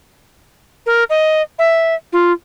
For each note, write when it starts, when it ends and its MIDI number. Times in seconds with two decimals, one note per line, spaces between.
0.86 1.03 70
1.10 1.42 75
1.58 1.94 76
2.12 2.32 65